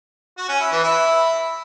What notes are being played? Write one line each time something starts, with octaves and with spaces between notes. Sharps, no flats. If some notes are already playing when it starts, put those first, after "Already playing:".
F#4
C#4
E4
E3
E4